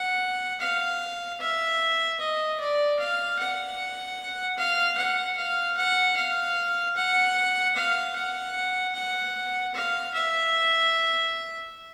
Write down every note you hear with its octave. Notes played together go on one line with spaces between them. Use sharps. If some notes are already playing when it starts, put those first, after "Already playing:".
Already playing: F#5
F5
E5
D#5
D5
F5
F#5
F5
F#5
F5
F#5
F5
F#5
F5
F#5
F#5
F5
E5